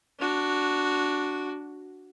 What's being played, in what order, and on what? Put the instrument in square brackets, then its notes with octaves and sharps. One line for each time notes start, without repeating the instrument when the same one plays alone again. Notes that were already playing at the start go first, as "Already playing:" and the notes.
[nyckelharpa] D4 F#4